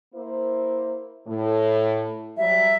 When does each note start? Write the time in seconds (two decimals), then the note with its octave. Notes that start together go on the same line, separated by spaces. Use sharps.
0.14 A#3 E4 C5
1.27 A2
2.37 F#3 G3 E5